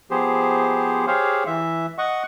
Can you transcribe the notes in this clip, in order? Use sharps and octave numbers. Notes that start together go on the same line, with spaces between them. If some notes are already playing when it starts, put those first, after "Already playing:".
F3 B3 G4 G#4 C5
G4 G#4 C5 C#5 F5
E3 E5
D#5 F#5 C#6